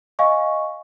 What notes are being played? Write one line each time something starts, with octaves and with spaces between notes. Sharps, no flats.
D#5 F5 G#5 C#6